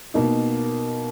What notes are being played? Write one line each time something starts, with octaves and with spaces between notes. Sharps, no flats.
B2 A#3 D#4